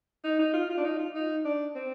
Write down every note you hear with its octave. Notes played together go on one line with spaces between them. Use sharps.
D#4
D#4
F4
F4
D4
D#4
F4
D#4
D4
C4